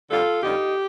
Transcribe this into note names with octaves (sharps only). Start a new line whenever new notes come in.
F2 D3 G3 F4 A4
F2 D3 G3 D#4 G4